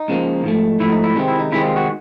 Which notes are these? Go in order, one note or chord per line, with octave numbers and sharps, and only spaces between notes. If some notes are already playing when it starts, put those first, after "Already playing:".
Already playing: D#4
C#2 C#3 F3 A#3
G#2 F3 A3
G#2 F3 A3 E4
D#4
E4
C3 D#3 G#3 C4 D#4
E4
D#4
C3 D#3 G#3 C4 E4
F4
F#4